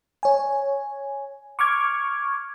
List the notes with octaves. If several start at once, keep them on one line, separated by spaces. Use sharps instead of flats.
C#5 G#5
C#6 D6 F6 G#6